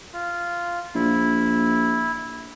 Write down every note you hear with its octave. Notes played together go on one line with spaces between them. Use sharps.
F4
A#1 E4